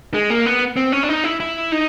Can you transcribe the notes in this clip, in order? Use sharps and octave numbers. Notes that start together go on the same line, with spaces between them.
G#3
A#3
B3
C4
C#4
D4
D#4
E4
E4
D#4